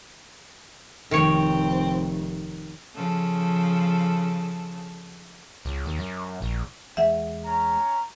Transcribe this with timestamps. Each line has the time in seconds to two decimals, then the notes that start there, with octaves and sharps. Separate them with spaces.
1.11 F1 D#3 C4 C#5
2.96 C#3 F3 A4
5.65 C#2
5.86 D#2
5.99 F#2
6.42 A#1
6.97 E2 G#3 E5 F#5
7.44 C#4 A#5